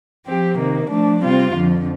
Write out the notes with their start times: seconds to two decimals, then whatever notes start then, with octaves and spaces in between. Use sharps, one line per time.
0.25 F3 C4 G4
0.57 C3 D#3 A#3
0.89 F3 A3 D4
1.21 C3 G3 C4 F4
1.53 F2 D3 F3